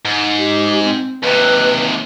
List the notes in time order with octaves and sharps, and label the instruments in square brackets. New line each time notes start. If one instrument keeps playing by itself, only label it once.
[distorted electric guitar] G#2
[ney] G4
C4
[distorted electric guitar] D#2 C3 [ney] B4